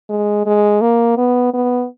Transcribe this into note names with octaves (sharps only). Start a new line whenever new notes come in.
G#3
G#3
A#3
B3
B3